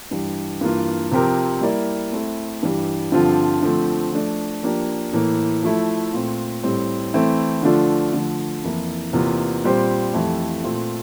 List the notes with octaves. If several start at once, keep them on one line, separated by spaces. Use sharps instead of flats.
G2 E3 G3
G2 E3 A#3 F4
C3 F3 C4 G4 A#4
G3 A#3 E4 A#4 D5
A3 C4 E4
G2 E3 G3
G2 D3 F3 C4 F4
D3 F3 A3 C4
F3 A3 D4
F3 A#3 D4 G4
A2 E3 A#3
F3 A3 E4
A#2 A3 C4
A2 G3 C4
E3 A3 C4 E4
D3 F3 A3 D4 F4
D3 F3 A3
F2 E3 A#3 E4
E2 C3 E3 A#3 F4
A#2 G3 C4 G4 C5
F2 E3 A3 E4 G4
A#2 A3 C4